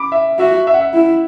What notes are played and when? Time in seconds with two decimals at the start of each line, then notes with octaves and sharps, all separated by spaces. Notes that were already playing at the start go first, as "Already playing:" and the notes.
Already playing: B5 D6
0.12 E5
0.39 F#4 E5
0.67 E5
0.74 F#5
0.81 E5
0.94 E4